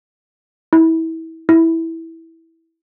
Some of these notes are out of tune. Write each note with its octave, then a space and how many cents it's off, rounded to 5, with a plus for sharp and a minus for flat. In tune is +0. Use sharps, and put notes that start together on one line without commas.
E4 -25
E4 -10